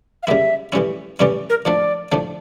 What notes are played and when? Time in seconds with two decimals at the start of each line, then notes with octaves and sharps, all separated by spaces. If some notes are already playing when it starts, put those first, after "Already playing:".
0.23 F5
0.27 C#3 G3 A#3 E4 E5
0.72 A2 E3 G3 C#4 E4
1.19 A2 E3 G3 C#4 E4 D5
1.50 A#4
1.65 A2 F3 A3 D4 D5
2.12 A2 F3 A3 D4